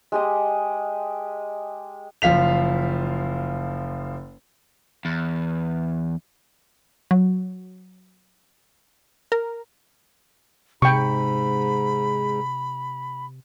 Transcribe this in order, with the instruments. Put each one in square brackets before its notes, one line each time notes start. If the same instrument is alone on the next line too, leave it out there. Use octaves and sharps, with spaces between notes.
[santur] G#3 G4 D#5
[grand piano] F#1 F3 F5 B6 F7
[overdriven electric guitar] E2
[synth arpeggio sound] F#3
A#4
[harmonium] G#2 [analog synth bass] C3 [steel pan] G5 C#6 [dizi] B5